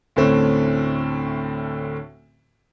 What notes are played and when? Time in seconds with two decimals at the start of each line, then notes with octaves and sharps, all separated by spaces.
0.16 D2 A2 D3 C4 C#4